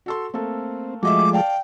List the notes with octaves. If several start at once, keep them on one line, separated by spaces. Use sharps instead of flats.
F#4 A4 C6
A3 A#3 C4 A4
F3 G#3 A3 F#4 D#5 E5 D6
D5 F5 G5 A5